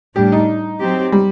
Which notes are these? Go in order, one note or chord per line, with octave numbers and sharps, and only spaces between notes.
A2 G3 D4 G4
D#4
F#3 C4 G4
G3